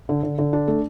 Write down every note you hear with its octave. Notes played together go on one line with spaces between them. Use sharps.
D3
D3
D3
D4
A3